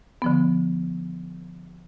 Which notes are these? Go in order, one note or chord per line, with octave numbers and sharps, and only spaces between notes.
D3 F3 B3